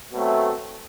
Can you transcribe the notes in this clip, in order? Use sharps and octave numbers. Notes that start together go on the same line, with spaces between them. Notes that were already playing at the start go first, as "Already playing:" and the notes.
B2 F#3 A3 C4